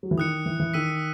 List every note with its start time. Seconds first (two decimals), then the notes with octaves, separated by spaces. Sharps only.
0.03 F#3
0.11 E3
0.18 D#3 D#6 F#6 C#7
0.46 E3
0.60 E3
0.74 D#3 E6 B6 D#7